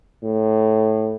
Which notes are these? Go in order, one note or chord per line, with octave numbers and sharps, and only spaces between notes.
A2